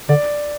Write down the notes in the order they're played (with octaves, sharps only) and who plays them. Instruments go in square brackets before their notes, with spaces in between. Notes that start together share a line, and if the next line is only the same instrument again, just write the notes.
[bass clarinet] D3 [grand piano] D5